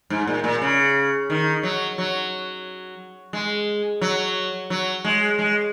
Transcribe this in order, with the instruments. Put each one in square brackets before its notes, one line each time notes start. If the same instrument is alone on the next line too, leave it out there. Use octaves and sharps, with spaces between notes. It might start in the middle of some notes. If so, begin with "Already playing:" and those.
[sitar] G#2
A#2
A#2
C#3
D#3
F#3
F#3
G#3
F#3
F#3
G#3
G#3